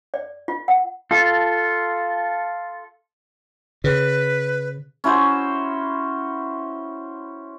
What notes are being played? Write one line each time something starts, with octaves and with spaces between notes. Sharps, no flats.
D5
F4
F#5
F4 A4
C#3 B4
C#4 E4 F#4 C5